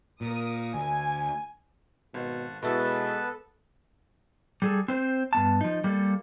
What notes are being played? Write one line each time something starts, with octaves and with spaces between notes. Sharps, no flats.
A#2 A#4 D#6
D2 G#5
G#1 B2 F#5 A5
B2 G#3 B3 E4 A4 B4 A5 A6
G3 G#4 A4
C4 C5
G2 B3 A5
F3 D#4
G3 A#3 A4